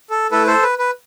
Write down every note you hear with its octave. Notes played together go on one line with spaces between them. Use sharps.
A4
A3 E4 A4 B4
A4 C5
B4
B4